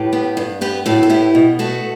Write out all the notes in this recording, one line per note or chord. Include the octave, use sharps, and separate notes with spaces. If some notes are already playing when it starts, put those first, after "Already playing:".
Already playing: A2 G4 B4
B3
G2
B3 G4 B4
A2 F#4 A4
A4
B3 E4 G4
B2
A3 F#4 A4